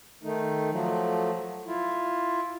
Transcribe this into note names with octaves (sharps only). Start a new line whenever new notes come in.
D#3 A3 D#4
F3 F#3 A3
E4 F4